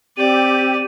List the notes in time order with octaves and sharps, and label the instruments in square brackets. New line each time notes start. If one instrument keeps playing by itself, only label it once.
[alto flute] C4 [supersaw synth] G4 [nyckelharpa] D5 [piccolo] D#7